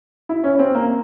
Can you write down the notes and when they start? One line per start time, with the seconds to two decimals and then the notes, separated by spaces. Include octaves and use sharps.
0.29 E4
0.44 C#4
0.55 C#4
0.59 C4
0.75 A#3